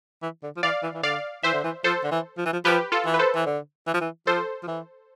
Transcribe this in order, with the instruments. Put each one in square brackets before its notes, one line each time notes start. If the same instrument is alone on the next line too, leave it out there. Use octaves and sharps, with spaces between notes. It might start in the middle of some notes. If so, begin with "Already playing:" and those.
[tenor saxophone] E3
D3
F3
[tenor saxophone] E3 [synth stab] D5 F5
[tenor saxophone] E3
E3
[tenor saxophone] D3 [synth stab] D5 F5
[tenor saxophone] E3 [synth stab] C5 E5
[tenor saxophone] D3
E3
[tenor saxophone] F3 [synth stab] A4 C5
[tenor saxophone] D3
E3
F3
E3
F3
[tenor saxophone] F3 [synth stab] G4 B4
[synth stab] F4 A4
[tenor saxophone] E3
[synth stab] B4
A4 C5
[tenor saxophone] E3
D3
E3
F3
E3
[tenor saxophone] F3 [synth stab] A4 C5
[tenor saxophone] F3
E3